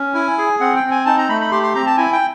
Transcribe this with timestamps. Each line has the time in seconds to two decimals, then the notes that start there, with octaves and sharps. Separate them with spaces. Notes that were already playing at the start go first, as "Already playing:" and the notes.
Already playing: C#4
0.14 E4 G#5
0.38 G#4
0.60 C4 F#5
0.76 G5
0.83 C4
0.91 G#5
1.06 D#4 A5
1.18 A#5
1.29 A3 B5
1.41 B5
1.51 G4 C6
1.63 C6
1.75 C4 A#5
1.86 A5
1.97 E4 G#5
2.13 G5